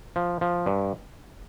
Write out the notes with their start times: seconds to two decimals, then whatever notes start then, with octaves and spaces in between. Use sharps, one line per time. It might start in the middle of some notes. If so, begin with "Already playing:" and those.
0.16 F3
0.41 F3
0.66 G2